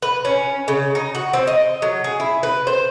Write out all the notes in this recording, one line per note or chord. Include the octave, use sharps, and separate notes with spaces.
B4
C#4
C#3
D#4
F#4
C4
D#5
F#3
G#4
E4
B4
C5